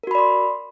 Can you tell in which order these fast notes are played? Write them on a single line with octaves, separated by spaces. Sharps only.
A#4 F#4 B5 D5 C6